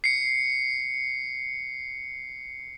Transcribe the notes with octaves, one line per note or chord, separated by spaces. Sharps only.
C7 C#7